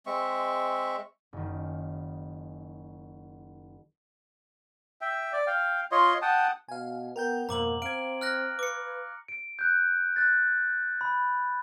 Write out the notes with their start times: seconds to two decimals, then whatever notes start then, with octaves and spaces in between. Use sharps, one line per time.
0.06 G#3 C4 E5 C#6
1.33 F#1 D#3
5.01 E5 G5
5.33 D5
5.47 F5 G5
5.92 F4 C#5 D#5 C6
6.22 F#5 G5 A5 D#6
6.68 B2 F5 G#5
7.16 B3 A#4 G5 G6
7.49 F2 G#2 B2 A#3 A#5 D6 F#7
7.82 C4 F5 G#6 D7
8.21 F6 F#6 A#6
8.59 B4 D6 C#7
9.28 D7
9.59 F#6 G6
10.16 F#6 A6
11.01 B5